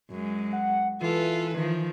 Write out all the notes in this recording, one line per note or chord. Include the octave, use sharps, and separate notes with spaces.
F#2 G#3
F#5
E3 F4 A4 B4
D#3 F3